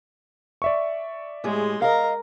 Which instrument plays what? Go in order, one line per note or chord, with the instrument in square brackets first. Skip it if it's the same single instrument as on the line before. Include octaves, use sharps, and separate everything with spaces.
[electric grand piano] D5 E5 C#6
[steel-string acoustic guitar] A2 G4 G#4 [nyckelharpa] G#3 C6
[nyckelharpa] A#4 A#5 [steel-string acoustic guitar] D#5 F5